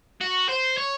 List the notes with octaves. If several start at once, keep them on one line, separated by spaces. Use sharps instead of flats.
F#4
C5
C#5